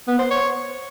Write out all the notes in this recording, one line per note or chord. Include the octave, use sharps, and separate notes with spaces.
B3
C5
C#5